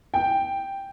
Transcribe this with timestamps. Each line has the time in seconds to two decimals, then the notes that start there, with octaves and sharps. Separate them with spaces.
0.14 G5